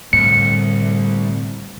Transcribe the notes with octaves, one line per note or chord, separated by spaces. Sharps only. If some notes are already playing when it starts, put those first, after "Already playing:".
C2 A2 D3 A3 C#7